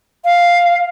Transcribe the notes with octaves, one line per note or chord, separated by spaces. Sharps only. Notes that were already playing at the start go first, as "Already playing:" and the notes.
F5